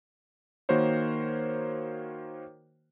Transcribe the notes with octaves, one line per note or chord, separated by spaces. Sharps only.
D#3 A#3 F#4 A#4 C5 C#5